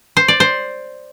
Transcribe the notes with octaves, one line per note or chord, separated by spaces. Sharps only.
C5
D5
C5